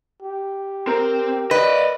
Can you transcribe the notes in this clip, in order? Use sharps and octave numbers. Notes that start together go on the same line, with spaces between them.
G4
C4 A#4
B4 D5 D#5